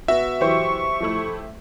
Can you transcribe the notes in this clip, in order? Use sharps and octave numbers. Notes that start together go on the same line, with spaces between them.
B3 F#4 E5
E3 F#3 G4 C5 C#6
F3 A3 E4